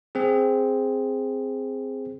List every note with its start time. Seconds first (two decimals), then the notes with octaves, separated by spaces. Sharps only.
0.15 C4 G#4